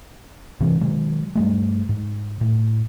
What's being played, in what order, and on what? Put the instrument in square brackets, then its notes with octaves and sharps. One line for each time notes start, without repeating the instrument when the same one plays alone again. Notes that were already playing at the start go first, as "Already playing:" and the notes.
[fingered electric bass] G#2 C3 E3
B2 D#3 F#3 G#3
G2 G3 A3
G#2
A2